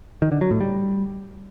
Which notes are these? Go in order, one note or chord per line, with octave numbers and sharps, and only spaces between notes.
D#3
D3
F#3
A2
G3